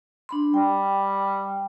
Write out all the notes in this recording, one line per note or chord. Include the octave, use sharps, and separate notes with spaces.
D4 B5 C6
G3 G5